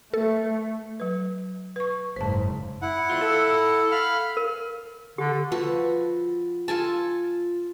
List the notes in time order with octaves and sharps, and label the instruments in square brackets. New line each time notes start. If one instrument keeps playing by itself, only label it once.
[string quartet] A3 [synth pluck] A4
[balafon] F#3 B4
B4 C#6
[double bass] F#1 G#2 [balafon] C5 A5
[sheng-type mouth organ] E4 F#5
[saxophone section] E2 F4
A4
[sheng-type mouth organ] F5 B5 F6
[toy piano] A#4
[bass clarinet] D3 [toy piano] G4
[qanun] F3 F#4 A4 B4
F4 A4 G#5 A5